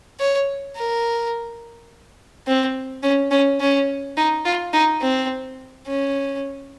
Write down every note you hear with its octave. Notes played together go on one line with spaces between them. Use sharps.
C#5
A#4
C4
C#4
C#4
C#4
D#4
F4
D#4
C4
C#4